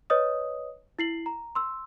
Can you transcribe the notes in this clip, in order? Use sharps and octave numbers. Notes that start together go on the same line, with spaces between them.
B4 C#5 D#5 D#6
E4 C7 F#7
A#5
C6 E6